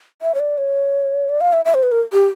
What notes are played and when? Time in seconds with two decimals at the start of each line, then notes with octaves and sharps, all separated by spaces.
0.22 E5
0.35 C#5
0.40 D5
0.58 C#5
1.29 D5
1.41 F5
1.53 E5
1.65 E5
1.74 C5
1.83 B4
1.92 A#4
2.13 G4